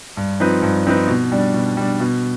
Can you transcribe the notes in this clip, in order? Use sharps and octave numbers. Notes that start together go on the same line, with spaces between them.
G2
F3 C4 D#4 B4
G2
F3 C4 D#4 B4
B2
G3 D4
B2
G3 D4
B2